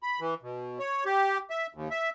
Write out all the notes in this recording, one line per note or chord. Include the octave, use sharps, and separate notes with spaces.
B5
E3
B2
C#5
G4
E5
D#2
E5